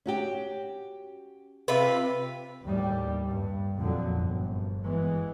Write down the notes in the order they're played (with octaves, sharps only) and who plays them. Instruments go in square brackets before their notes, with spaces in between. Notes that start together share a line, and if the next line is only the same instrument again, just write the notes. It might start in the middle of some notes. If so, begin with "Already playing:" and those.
[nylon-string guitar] C#4 F#4 G4
[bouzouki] C3 F4 B4
[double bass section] D#2 A2 G3
G2
F2 A#2 D3 F3 F#3
G1 F#2
E3 G#3 B3